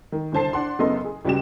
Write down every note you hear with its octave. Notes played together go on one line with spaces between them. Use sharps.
D#3
C2 D3 C5 A5 C7
D4 F#5 C6
F#1 C#3 B3 A4 D#5 C6
G#4
C#2 C#3 G3 F#4 G4 E7